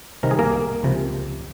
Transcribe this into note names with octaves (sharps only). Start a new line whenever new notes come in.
C2 C3 D#3 A#4
G#4
A#3 A#4
C#2 C3 F3